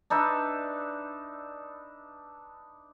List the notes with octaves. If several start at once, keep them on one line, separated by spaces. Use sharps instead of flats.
D4 D#4 B4 E5